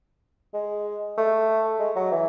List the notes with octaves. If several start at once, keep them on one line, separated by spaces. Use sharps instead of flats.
G#3
A3
G#3
F#3
E3